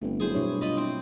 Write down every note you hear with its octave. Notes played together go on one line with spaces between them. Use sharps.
G1 A3 C4
F#3 E4 G#4 C5
G2 B2 E4 C#5
F4 D#5 B5
C4 E4